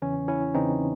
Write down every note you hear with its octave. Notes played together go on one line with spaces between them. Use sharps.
E2 C#3 E3 C#4
C#4 E4
E2 C#3 E3 C4 D#4